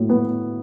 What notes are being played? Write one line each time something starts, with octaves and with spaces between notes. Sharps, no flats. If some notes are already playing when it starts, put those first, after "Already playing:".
Already playing: A2 F#3
B3